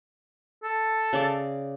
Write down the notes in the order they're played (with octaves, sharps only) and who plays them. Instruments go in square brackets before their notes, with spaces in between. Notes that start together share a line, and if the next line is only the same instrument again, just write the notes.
[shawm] A4
[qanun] C#3 D5